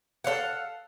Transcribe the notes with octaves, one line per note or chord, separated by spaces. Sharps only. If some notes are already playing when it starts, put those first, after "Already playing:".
A4 C5 F5 F#5